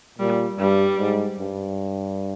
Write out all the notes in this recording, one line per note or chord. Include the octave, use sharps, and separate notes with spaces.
A#2 G3
G2 G3
G#2
G2